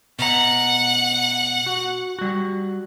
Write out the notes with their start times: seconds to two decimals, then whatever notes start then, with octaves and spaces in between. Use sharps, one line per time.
0.19 B2 F#5 A#5
1.66 F#4
2.19 G3 F#4